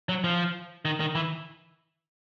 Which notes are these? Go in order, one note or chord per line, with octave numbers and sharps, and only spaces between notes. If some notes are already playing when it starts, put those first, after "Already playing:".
F#3
F3
D#3
D#3
E3